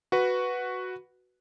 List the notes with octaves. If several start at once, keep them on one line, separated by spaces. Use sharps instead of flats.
F#4 B4